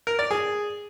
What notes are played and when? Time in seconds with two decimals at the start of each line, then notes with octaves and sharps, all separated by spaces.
0.07 A#4
0.19 D5
0.31 G#4